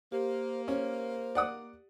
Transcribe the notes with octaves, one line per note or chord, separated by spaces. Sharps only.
A#3 G4 C5
C#4 C5
D5 F#5 D#6